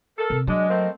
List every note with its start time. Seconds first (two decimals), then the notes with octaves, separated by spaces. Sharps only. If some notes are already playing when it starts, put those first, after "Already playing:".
0.17 A4 A#4
0.30 C3
0.47 F#3 G#3 D4 D#5
0.69 A3 A#3 C4